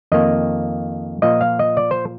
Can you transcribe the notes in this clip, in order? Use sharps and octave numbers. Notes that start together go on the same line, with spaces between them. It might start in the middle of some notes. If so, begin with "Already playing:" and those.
F2 D#3 A#3 D#5
A#2 F3 A#3 D#5
F5
D#5
D5
C5